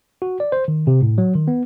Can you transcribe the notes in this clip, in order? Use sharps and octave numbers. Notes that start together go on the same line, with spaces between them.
F#4
D5
C5
D#3
C3
A2
F#3
D#3
B3